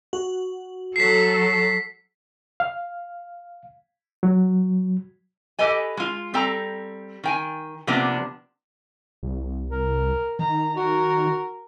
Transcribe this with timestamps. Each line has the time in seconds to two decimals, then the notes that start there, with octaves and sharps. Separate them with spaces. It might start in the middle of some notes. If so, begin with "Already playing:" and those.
0.13 F#4
0.96 F#3 A4 B6 C7
2.60 F5
4.23 F#3
5.59 G4 A4 B4 D#5 G#5
5.97 G#3 F4
6.34 G3 C4 A4 G5 A#5
7.24 D#3 G5 G#5
7.87 C3 F3 A#3 B3 D4
9.23 C2
9.70 A#4
10.39 D#3 A#5
10.77 F#4 A#4